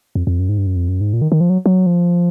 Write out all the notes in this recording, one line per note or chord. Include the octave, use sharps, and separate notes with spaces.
F2
F2
F#2
G#2
G2
F#2
F2
F#2
G#2
A#2
D#3
D#3
F3
F#3
F#3
F3